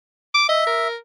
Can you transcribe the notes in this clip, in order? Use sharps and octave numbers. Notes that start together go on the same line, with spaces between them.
D6
D#5 E5
A#4